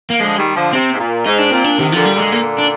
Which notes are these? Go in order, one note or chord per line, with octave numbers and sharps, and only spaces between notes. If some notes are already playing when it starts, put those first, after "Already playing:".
A#3
D3 F3 G#3
D#3 G3
D3 F3
C3 C4
G#2
A#2
G#2 D#4
D4
A#2 C4
D4
C3 D#3
A#2 D3 F3
G3
A#2 D3 G#3
A#3
D4